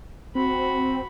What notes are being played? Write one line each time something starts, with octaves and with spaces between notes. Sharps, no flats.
C4 F#4 B5